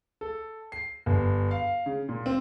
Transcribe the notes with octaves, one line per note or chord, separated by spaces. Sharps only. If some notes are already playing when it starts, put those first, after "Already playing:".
A4
C7
G1
F5
C#3
A#2
C4